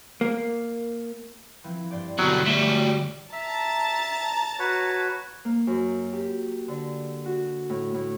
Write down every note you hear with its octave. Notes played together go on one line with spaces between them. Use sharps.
A#3
E3 F3 C4
G2 C5 D5
B2 D3 F#3 G3
F#3 G3 A3 E5
E5 A5 A#5 A6
F#4 B4 C#5
A#3
F#2
G4
D3
F#4
A2
A2